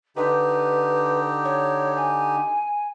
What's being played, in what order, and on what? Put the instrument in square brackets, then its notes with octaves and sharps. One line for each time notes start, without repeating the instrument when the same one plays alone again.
[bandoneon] D3 D#4 G4 [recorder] B4
[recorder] C#5
G#5